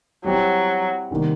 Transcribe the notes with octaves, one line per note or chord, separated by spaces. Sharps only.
F#3 G3 C4 E4 G4
C3 D#3 G3 A#3